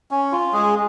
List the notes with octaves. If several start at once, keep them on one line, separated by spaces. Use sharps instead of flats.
C#4
F4
G#3 G#4